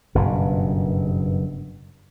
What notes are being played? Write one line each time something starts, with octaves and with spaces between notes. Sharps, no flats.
F#1 G2 B2